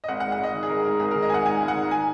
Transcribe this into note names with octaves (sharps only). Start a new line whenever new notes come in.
D#5
G#1 F#5
F#5
G#2
F#5
G#1 D#5
D#3
G#4
G#1 A#4
G#2 A#4
G#1 G#4
D#3 A#4
D#5
G#1 F#5 G#5
G#2 G#5
G#1
F#5
D#3
G#5